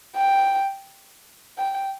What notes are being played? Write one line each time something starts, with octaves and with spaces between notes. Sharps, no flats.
G5
G5